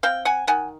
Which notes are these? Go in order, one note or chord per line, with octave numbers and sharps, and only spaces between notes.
C4 F5 G5
F#5 G#5
D#3 F#5 G#5